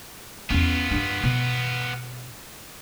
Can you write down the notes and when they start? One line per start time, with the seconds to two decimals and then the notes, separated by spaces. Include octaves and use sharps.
0.50 E2 B3 C#4 F4
0.91 G2 D4
1.23 B2